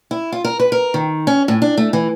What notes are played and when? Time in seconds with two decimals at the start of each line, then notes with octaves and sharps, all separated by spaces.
0.11 E4
0.32 F4
0.44 A#4
0.60 B4
0.72 A#4
0.94 D#3
1.27 C#4
1.48 A2
1.62 D4
1.78 A3
1.93 E3